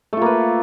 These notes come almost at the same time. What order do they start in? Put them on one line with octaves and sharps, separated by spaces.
A3 F4 A#3 B4